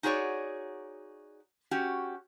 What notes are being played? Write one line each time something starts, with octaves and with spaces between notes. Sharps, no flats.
D#4 F#4 G#4 B4 C#5 D5
C#4 F#4 G4